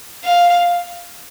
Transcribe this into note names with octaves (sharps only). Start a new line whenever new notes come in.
F5